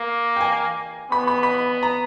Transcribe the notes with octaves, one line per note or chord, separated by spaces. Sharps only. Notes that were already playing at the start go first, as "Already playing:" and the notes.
Already playing: A#3
G5
G#5
B3 B5
B5
B5
A#5